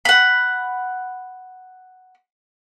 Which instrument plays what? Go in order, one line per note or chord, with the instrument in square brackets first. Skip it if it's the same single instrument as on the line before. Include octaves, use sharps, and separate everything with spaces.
[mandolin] F#5 B5